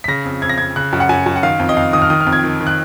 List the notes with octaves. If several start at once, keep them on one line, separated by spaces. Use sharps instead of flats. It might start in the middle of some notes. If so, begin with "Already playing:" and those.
B6
C#3 A#6
F2
F2 G#6
A#6
F2 G#6
C#3 F#6
F#2
F#5
F#2 G#5
F#2
F#5
D#3 F5
F2
D#5
F2 F5
D#3 D#6
F6
D#3 D#6
F6
F2
G#6
D#3
D#3
F#6